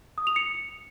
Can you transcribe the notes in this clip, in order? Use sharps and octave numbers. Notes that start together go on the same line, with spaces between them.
D#6
F7
C#7